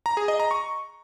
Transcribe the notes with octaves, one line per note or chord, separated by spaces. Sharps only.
A#5
G#4
D#5
A#5
C#6